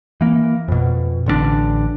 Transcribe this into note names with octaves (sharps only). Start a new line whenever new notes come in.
E3 A#3
F2 B2
A1 D3 A3 D4